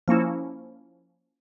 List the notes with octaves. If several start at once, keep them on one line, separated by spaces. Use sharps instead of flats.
F3 A#3 C#4 E4